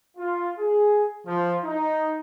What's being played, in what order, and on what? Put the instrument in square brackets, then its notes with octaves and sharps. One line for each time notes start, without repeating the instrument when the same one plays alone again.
[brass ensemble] F4
G#4
F3
D#4